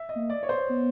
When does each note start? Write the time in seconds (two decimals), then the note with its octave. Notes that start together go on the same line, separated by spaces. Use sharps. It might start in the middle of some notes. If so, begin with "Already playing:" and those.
Already playing: E5
0.09 D#5
0.15 A#3
0.30 D5
0.43 C#5
0.49 C5
0.69 B3